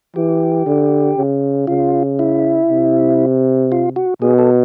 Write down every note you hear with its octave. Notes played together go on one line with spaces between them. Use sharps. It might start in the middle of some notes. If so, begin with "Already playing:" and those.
E3 G4
D3
C#3
C#3 F4
E4
C3
F4
F#4
B2 G#4
A4